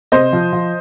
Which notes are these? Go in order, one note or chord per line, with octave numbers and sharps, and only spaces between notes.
C3 C5 D#5
F3
F3